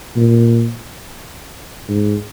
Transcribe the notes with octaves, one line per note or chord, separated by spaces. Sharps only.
A#2
G#2